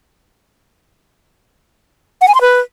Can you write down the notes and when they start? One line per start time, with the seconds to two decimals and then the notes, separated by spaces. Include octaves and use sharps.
2.21 F#5
2.28 G#5
2.35 C6
2.41 B4